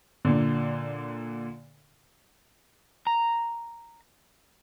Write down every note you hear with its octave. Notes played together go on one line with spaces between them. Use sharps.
A#2 D3
A#5